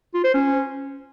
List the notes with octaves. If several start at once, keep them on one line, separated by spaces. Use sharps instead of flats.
F4
C5
C#4